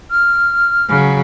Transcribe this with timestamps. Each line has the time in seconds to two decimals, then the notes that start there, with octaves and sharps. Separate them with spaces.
0.10 F6
0.89 C#3 F#3